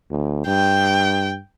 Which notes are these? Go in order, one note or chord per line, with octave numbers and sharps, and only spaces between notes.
D2
G2 G5